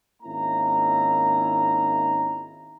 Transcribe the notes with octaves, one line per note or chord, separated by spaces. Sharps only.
G#1 A#3 C#4 D#4 E4 A#5